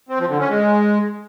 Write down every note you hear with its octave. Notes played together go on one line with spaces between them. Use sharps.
C4
F3
D3
C#4
G#3